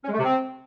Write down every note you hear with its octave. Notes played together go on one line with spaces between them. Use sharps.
C#4
G#3
A3
C3
C4